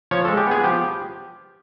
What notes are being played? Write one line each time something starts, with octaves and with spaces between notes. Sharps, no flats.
F3 C#5
G#3 A4
G4
B3 G#4
F3 G4